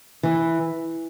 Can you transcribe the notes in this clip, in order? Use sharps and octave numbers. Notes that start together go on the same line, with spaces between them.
E3